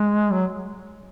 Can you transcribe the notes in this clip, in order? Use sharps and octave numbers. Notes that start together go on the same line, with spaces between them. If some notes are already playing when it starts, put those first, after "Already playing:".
Already playing: G#3
F#3